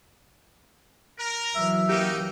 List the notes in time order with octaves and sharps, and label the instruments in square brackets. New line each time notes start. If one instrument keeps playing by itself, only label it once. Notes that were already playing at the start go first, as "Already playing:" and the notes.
[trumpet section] A#4
[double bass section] E3 F#3 [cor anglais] E5
[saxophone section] F#2 A#3 G4 [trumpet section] D#4